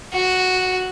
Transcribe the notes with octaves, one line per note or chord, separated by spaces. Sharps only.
F#4